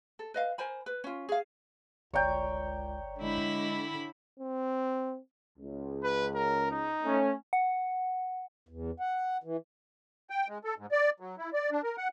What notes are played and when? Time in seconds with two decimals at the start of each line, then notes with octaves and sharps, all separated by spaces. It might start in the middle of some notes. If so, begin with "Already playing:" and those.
0.19 A4
0.34 B4 D#5 F5
0.58 A#4 C5 G#5 B5
0.86 B4
1.04 C#4 F4
1.29 G#4 F5
2.14 G1 C#2 C#5 D5 G5 A#5
3.19 D3 G#3 E4 B5
4.39 C4
5.58 C#2
6.03 B4
6.35 A#4
6.71 D#4
7.03 A3 C#4
7.53 F#5
8.69 E2
9.00 F#5
9.44 E3
10.30 G5
10.48 G#3
10.64 A4
10.78 G#2
10.92 D5
11.20 F#3
11.38 E4
11.53 D5
11.71 D4
11.83 A#4
11.98 F#5